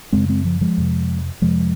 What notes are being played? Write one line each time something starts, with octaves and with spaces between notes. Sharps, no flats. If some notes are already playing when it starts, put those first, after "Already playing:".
F#2 C#3 G#3 C4
G#3 C4
F3
F3 G#3
F2 C3
F2 C3 F3 G#3